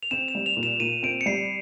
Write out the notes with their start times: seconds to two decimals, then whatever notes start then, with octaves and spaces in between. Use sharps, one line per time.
0.03 F7
0.11 C4 E7
0.28 E7
0.35 G3
0.46 F7
0.57 A#2
0.63 E7
0.80 A#2 D#7
1.03 C4 D7
1.21 C#7
1.26 G3 C7